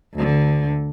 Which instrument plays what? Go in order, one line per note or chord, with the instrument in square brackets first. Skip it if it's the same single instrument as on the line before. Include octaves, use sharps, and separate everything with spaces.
[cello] D2 D3